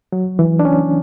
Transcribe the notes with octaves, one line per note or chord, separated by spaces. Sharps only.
F#3
E3
D4
C#4